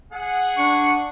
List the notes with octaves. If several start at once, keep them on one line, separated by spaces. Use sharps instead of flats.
G#4 F#5
D4 C#6